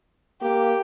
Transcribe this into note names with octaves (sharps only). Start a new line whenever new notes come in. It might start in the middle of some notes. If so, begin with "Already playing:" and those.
A#3 G4